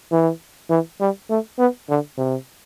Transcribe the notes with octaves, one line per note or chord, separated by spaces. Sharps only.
E3
E3
G3
A3
B3
D3
C3